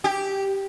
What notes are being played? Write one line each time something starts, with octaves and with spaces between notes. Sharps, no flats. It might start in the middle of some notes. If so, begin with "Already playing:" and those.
G4